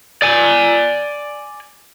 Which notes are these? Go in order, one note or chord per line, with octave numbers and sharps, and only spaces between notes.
D5 G#5